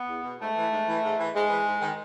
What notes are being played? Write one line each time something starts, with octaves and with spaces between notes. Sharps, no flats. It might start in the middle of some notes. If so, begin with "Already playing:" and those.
Already playing: B3
E2
B2
G#2 A3
E3
G#2
E3
G#2
E3
G#2 G#3
E3
G#2
D#3